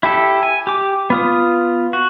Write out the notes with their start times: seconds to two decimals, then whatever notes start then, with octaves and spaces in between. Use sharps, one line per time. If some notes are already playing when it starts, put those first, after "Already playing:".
0.03 E4 G4 A4
0.43 G#5
0.67 G4 D6
1.10 B3 F4 D#6
1.93 F#4